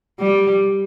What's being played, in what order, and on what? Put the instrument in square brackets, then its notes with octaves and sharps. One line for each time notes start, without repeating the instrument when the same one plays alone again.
[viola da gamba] G3